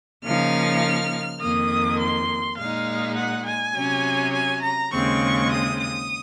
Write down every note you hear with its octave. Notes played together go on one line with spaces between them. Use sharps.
C#3 F3 A#3 D#4 F6
F2 D#3 A#3 D#6
C6
A#2 G#3 D#4 F5
F#5
G#5
C3 F#3 C#4
G#5
A#5
D#2 C#3 G#3 C4 C#6
D#6
D#6